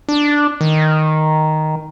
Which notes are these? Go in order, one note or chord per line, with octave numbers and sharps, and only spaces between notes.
D4
D#3